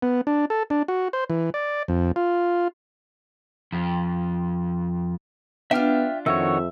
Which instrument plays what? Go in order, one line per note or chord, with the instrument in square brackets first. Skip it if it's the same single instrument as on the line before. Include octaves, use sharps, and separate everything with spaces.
[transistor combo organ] B3
D4
A4
D4
F#4
C5
E3
D5
F2
F4
[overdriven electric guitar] F2
[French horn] B3 [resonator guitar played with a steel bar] D4 F4 [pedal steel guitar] E5 G5 F6
[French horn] F2 [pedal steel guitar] D#3 F#4 C#5 [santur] E5